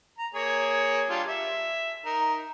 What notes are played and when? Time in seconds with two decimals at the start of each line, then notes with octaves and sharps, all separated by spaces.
0.18 A#5
0.34 A#3 G#4 C#5
1.09 G3 D4 F4
1.28 E5
2.05 D#4 A#4